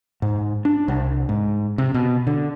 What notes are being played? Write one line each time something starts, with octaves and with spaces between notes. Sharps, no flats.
G#2
D4
C2
G#2
C3
B2
D3